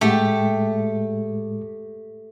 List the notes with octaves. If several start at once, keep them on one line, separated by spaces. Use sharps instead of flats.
A2 G#3 A3 G4